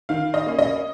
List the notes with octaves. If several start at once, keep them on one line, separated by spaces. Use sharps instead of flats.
D#3 F5
D#5
A#3 C#4
D#5